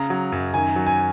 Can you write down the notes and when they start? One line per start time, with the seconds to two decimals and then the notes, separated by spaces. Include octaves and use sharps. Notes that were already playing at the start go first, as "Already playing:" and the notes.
Already playing: C#3 A#5
0.10 F#3
0.32 F#2
0.54 D#3 G#5
0.76 F#3
0.87 G#5